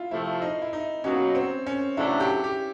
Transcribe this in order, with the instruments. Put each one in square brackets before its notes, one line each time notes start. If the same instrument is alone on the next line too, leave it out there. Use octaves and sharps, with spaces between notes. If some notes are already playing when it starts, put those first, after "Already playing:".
Already playing: [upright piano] E4 F4
[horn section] C3 F3 A3 [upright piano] E4
[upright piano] D#4
E4
D#4
[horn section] B2 F#3 A#3 D#4 F#4 [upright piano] C#4
[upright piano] C4
C#4
[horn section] C#3 F#3 A3 D4 [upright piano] E4
[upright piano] G4
G4